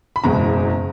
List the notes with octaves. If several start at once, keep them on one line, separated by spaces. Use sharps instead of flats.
B5
F#1 E2 B2 G#3 A#5